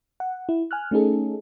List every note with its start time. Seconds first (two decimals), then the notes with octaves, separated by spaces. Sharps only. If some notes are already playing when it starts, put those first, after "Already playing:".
0.20 F#5
0.49 E4
0.71 G#5 F6 F#6
0.91 A3 C#4 D#4 G#4 A4